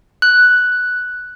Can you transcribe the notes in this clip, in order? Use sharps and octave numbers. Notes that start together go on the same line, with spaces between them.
F#6